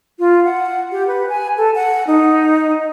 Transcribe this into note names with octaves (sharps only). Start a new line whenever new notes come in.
F4
F#5
G4
B4
G#5
A4
F#5
D#4